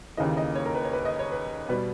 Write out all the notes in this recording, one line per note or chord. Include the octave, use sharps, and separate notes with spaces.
D#2 C#3 E3 A#3 D#5
D#5
C#5
A#4
B4
C#5
B4
D#5
C#5
B4
B2 G3 B3 B4